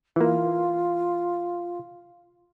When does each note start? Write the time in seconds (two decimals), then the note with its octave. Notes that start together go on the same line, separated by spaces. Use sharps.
0.16 E3 A#3 F4